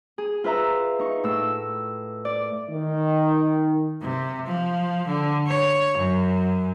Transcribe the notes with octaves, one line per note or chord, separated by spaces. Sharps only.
G#4
F4 B4 E5 A#5
D#4 C#6
A2 E6
D5
D#3
C3
F3
D3
C#5
F#2